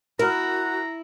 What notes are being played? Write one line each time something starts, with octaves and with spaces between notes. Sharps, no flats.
E4 F#4 A#4 A#5